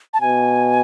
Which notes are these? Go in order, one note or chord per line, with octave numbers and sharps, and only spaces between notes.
A5
B2 G#5